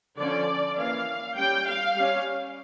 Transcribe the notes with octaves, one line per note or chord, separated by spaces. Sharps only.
D3 F3 C#4 D5
E3 A#3 C#4 F5
G3 C#4 G5
F5
G3 C#4